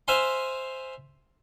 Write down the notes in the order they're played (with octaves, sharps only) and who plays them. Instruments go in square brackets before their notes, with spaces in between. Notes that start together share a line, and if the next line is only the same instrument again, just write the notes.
[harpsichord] C5 E5 F5 G#5 C6